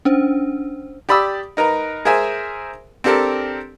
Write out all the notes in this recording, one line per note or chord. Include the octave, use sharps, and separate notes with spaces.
C#4 D4 C5
G4 D5 B5 D#6 E6
D#4 A#4 B4 A#5
G#4 A#4 C5 E5 G#5
C4 D4 G4 A4 A#4